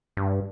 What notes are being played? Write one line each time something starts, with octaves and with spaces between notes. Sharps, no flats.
G2